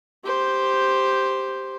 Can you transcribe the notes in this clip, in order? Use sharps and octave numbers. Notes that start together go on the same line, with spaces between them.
G4 C5